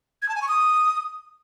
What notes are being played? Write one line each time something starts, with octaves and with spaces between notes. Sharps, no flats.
G#6
A5
G#5
C#6
D#6